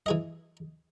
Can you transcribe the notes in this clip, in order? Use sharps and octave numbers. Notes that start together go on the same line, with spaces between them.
E3 G#4 D#5